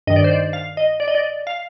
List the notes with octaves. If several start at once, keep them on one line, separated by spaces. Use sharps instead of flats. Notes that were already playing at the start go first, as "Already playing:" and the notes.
G2 D#3 D#5
D5
C5
D5
F5
D#5
D5
D#5
D5
F5